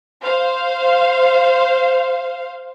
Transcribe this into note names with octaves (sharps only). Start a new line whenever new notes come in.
C5 F5